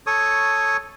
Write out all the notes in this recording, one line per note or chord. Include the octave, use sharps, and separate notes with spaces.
A4 C#5 C#6 D#6